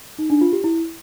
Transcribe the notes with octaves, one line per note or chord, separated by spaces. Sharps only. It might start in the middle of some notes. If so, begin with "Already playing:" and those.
D#4
D4
F4
G4
E4